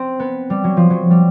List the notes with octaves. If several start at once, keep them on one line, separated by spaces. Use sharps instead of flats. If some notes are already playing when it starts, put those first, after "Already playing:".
Already playing: C4
B3
G3
F#3
F3
F#3
G3